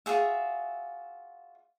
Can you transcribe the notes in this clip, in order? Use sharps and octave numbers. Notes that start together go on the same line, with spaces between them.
F4 F#4 G#4 E5